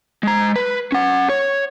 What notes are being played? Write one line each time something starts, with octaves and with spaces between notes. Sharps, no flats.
G#3 A#5
B4
C#4 F#5
C#5